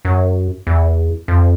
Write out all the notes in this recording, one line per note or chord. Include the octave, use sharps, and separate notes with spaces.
F#2
E2
F2